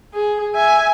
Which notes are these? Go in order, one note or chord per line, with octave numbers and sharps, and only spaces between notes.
G#4
E5 G#5